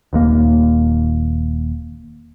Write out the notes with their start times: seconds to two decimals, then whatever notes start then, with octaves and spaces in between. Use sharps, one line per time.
0.13 D#1 D#2 A#3